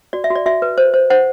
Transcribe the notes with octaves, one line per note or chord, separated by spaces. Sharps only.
F#4 D5
E5
F#4
D5
F#4 E5
B4
C5
C5
C5 F#5